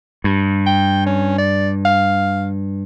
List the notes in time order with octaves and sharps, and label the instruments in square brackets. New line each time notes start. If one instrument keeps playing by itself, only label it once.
[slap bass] G2
[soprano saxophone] G5
C#4
D5
F5